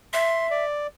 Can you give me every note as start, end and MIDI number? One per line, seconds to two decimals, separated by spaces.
0.13 0.64 76
0.13 0.47 84
0.51 0.87 74